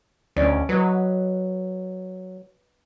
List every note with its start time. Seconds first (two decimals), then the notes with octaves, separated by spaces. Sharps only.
0.37 D2 C#4 D5 D#5
0.69 F#3 B4 D#5